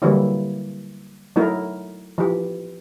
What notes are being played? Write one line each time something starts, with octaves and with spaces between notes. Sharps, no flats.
D3 E3 F#3 G3 A#3 E4
F#3 A3 D#4 E4 A#4
E3 F3 G4